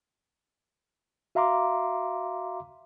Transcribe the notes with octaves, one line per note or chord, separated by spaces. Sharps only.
F#4 E5 F5 A#5 C6 D6